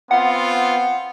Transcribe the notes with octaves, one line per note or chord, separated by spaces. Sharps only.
B3 C4 F4 F#5